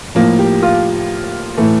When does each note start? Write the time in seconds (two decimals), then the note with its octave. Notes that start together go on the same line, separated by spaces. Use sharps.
0.15 A2 F3 A#3
0.39 G4
0.62 F4
1.57 A2 E3 A3